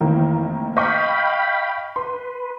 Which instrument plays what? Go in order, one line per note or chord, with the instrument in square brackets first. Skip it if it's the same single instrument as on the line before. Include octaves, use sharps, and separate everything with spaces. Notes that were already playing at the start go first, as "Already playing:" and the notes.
[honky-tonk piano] F1 D#3 A#3 [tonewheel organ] E3
[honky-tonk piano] D#5 C#6 G6 [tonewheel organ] F5 G5 B5
[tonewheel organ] B4 [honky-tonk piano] C6